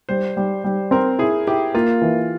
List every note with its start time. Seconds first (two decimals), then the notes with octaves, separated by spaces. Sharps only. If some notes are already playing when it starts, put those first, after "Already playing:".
0.09 G3 C5
0.37 G3
0.64 G3
0.91 C4 A#4
1.19 E4 G#4
1.47 E4 G4
1.74 A#3 F4
2.02 E3